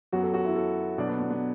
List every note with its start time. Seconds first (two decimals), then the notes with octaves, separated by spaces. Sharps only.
0.13 F#2 F#3 B3 F#4
0.23 A4
0.34 F#4
0.45 E4
0.55 A4
0.98 B2 F#3 D4 A4 D5
1.09 B3
1.20 B3
1.30 B3